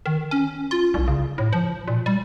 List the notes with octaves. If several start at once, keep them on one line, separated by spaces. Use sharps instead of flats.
D#3
C#4
F4
C2
C#3
A2
F3
A#2
G3